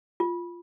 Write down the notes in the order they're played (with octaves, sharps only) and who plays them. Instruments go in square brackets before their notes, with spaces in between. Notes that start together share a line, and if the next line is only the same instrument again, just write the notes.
[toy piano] F4